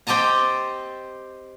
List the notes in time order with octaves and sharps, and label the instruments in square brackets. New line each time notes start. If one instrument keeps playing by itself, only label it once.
[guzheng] C4 G4 D#5 A5 A#5